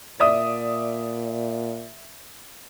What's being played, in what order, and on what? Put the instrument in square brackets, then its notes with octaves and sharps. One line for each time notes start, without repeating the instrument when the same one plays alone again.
[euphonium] A#2 [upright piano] D5 E5 D#6